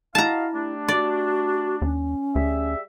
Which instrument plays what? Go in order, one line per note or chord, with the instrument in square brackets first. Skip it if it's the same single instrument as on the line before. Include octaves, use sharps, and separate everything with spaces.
[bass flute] E4 [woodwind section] F#4 D#5 F5 [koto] A5 A#5
[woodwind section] G3 A3 D4
[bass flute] F#4 [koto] D5
[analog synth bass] D#2 [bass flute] C#4
[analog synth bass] D2 [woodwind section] G3 G#4 E5